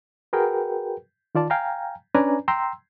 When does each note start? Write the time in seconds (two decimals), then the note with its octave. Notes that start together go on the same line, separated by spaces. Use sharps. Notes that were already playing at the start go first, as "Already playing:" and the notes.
0.33 F#4 G#4 A#4 B4 G5
1.35 D#3 F4 D5 A5
1.50 F5 G5 G#5 A#5
2.15 C#4 D4 B4 D5 G#5 A#5
2.48 G5 A#5 C6 E6